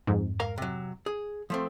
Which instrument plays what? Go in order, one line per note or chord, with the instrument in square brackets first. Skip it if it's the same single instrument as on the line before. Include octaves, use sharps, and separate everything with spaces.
[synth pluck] F2 G#2
[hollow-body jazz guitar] A#4 F5 A#5
C3 F#3
G#4
F3 A3 C4